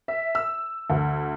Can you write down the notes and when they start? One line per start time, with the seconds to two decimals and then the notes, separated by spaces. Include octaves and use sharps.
0.08 E5
0.35 E6
0.90 D2